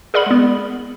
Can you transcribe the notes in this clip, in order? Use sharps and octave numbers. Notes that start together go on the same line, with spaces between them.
G#4 A#4 D5 F#5 B5
G#3 B3